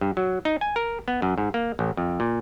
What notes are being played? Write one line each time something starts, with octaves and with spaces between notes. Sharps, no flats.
G2
F#3
D#4
G#5
A#4
B3
F#2
G#2
A#3
A1
F2
A#2